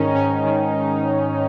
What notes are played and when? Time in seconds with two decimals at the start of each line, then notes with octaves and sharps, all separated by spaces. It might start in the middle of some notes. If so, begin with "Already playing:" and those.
Already playing: G#2 D#3 C#4 D#4
0.14 G#2 C#4
0.44 D#3